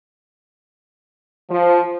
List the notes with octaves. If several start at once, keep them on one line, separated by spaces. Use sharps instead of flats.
F3